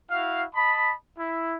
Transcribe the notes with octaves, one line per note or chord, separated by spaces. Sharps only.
E4 F#4 F5
D#5 A5 B5
E4